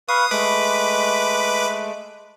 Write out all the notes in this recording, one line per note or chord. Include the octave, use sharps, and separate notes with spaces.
B4 F5 C#6 D#6
G#3 A3 B4 D6